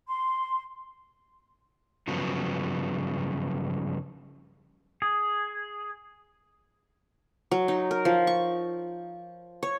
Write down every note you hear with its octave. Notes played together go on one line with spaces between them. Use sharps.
C6
G2 C#3 F3 F#3 B3
G#4
F#3
D#4
A#4
F3
C#6
C#5